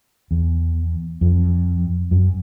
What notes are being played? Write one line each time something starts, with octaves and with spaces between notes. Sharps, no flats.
E2
F2
F#2